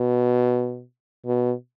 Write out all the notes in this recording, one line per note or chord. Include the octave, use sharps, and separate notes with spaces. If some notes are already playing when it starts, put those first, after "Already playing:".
Already playing: B2
B2